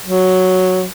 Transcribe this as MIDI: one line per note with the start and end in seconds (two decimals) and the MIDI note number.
0.06 0.85 54